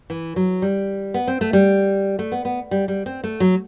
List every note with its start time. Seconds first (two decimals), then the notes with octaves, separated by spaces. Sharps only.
0.10 E3
0.36 F#3
0.62 G3
1.14 B3
1.28 C4
1.41 A3
1.53 G3
2.19 A3
2.32 B3
2.45 B3
2.71 G3
2.88 G3
3.06 C4
3.24 A3
3.40 F#3